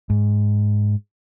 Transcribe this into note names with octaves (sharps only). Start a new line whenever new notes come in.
G#2